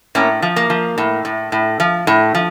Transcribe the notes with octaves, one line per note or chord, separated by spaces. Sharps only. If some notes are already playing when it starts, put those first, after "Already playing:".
A2 A#3 C#4
F3
A#3
F3
A2
A2
A2
F3
A2
F3